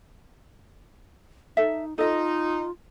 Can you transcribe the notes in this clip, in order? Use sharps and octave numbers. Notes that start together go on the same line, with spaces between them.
D#4 A4 E5
D#4 F4 A4 D#5